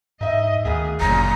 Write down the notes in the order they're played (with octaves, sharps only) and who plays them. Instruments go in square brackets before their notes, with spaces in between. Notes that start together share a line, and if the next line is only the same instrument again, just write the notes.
[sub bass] G#2 [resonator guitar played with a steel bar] D#4 E5 [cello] D#5
[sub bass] D2 [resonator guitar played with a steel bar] D#3 A#3 B3 [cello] G#4
[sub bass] G1 [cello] F#2 A#2 [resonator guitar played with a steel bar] C#3 C#5 [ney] A#5